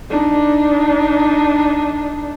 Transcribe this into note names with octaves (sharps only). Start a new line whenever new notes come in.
D4 D#4